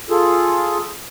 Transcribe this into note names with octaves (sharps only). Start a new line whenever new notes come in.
F4 G#4 A4